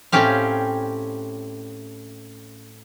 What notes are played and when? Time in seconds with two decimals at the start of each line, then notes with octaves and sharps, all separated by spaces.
0.12 A2 C4 C#4 G4 F5